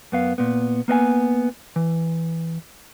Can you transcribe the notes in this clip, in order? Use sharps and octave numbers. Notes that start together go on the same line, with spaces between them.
F#2 B3 F5
A#2 B3
A#3 B3 D#5 G#5
E3